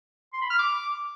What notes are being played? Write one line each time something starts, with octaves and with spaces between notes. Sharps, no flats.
C6
B5
F6
D6